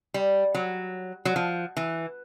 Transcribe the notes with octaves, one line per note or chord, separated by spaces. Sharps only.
G3
F#3
F#3
F3
E3